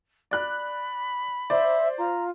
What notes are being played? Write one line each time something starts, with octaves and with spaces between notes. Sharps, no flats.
D5 B5 F#6
C5 D5 E5
F4 A#5